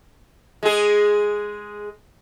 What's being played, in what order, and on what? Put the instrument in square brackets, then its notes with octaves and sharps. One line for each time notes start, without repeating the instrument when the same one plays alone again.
[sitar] G#3 G#4